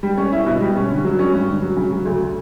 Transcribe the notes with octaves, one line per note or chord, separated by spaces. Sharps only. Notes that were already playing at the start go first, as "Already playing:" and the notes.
G3
C#4
E4
B2
G3
C#4
D3
F#3
C#4
G2
D3
F#3
C#3
F#3
D2